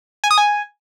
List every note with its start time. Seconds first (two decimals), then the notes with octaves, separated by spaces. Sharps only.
0.24 G#5
0.31 D#6
0.38 G#5